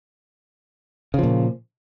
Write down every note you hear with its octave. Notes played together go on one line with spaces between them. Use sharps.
A#2 C#3 F3